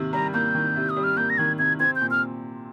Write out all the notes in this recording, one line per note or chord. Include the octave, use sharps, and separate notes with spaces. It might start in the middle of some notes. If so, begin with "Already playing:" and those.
Already playing: C3 D#3 A#3
G3 A#5
A#3 G6
D#3
C3
D#6
G3
F6
A#3 G6
A#6
D#3 G#6
C3 G#6
C4 G#6
G6
A#2
F6